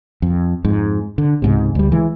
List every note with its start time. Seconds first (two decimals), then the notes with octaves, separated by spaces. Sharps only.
0.22 F2
0.64 F2 G#2
1.18 D3
1.42 C#2 G#2 C3
1.75 D2 G3
1.92 E3 G#3